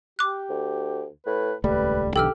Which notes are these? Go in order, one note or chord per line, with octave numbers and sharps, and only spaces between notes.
G4 D6 F#6
D2
A2 B4
D#1 C#2 G3 A3 B4
B1 D3 E3 G4 A4 E6 F6